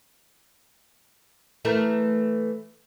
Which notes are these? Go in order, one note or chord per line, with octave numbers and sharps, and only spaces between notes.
E3 A3 A#4